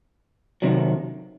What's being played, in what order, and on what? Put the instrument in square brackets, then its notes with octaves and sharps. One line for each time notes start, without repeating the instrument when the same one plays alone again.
[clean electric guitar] C3 D#3 F#3